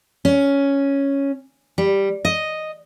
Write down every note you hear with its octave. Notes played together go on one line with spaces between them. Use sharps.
C#4
G3
D#5